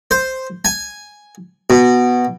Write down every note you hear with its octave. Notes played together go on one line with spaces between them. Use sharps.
C5
G#5
B2